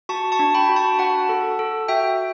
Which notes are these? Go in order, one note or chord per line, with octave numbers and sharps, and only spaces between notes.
F#4 A5 C#6
A5 C#6
D4
G5 B5
F#4
A5 C#6
F#4 F#5 A5
A4
A4
F#4 E5 G5